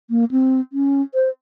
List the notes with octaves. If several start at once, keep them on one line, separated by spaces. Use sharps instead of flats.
A#3
C4
C#4
C5